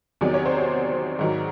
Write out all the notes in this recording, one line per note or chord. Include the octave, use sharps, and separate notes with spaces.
E2 C3 D#3 F#3 D5
C#5
C5
D5
G#2 D#3 F#3